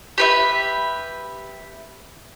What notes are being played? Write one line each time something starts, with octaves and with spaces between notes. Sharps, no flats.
G4 B4 E5